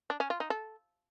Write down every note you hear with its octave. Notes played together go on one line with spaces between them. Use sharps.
D4
C#4
F4
D#4
A4